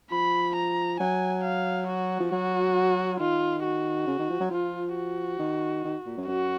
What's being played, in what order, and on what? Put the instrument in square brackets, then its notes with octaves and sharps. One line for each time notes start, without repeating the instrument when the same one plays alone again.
[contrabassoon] F3 [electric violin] B5
[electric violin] A#5
[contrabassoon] F#3 [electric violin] G#5
[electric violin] F5
F#4
[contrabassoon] F3
[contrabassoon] F#3 [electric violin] F#4
[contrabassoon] D#3 [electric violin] F4
[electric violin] F#4
[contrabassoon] C#3
D#3
F3
F#3
[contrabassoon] F3 [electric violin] F4
[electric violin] F#4
[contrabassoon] D#3
D#3
A#2
F#2
[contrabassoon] F#2 [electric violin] F#4